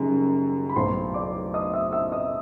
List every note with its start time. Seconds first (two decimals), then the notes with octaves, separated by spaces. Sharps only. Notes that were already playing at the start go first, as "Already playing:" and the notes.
Already playing: F#1 F#2 D#3 G3
0.69 B5
0.76 B1 A2 F#3 C5 C6
1.14 D5 D6
1.54 D#5 D#6
1.73 E5 E6
1.92 E5 E6
2.12 D#5 D#6